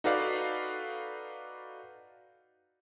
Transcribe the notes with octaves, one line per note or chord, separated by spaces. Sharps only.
D#4 F#4 A4 B4 D5 F5